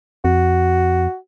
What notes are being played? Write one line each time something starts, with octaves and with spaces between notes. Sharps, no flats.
F2 F#4